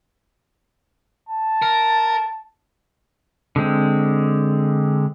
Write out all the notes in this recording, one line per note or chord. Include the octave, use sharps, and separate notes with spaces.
A5
A#4
D3 G#3 C4